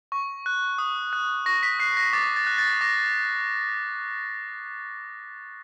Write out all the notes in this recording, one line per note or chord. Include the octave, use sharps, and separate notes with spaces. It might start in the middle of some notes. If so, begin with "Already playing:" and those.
C#6
F#6
D#6
F#6
C#6 A#6
B6
F#6 C7
A#6
D6 A6
A6
F#6
A6
D6 A#6